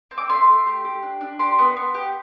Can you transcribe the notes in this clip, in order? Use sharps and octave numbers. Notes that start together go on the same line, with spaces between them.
C4
D6
A3 C6
A3
G4
G4
D4
D4
G4 C6
B3
B3
G4